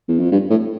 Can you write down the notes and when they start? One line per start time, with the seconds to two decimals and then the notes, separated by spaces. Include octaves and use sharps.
0.09 E2
0.20 F2
0.32 G2
0.50 A2